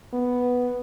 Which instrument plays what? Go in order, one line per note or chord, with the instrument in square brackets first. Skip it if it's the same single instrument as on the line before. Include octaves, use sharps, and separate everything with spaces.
[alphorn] B3